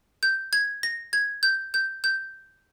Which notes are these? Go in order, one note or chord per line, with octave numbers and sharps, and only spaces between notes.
G6
G#6
A#6
G#6
G6
G6
G6